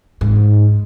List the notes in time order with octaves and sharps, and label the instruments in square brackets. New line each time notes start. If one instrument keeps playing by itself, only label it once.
[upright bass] G#2